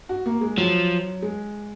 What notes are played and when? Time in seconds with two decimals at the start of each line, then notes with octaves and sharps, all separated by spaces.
0.09 F#4
0.26 A#3
0.41 G#3
0.57 F3 F#3
1.22 G#3